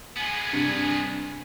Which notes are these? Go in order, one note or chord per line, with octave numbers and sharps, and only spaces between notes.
G#3 B3 G#5
G2 C3